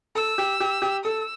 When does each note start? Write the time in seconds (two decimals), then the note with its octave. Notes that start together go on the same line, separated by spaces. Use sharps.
0.15 A4 E6
0.38 G4
0.60 G4
0.82 G4
1.04 A4 E6